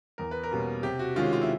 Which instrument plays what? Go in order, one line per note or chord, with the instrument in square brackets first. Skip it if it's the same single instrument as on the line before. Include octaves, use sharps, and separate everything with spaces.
[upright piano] E2 A#4
B4
A#4
B2 G3 A#3 C#4
C3 G4
F#4
D#3 G#3 C#4 F4
F4
E4